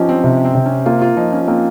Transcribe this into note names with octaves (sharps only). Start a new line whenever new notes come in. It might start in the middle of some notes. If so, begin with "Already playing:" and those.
Already playing: F3 C#4 D#4 G4
C4
C3
C4
C3
C#4
A#3 F4
F4
F3 D#4
C#4
A#3 C4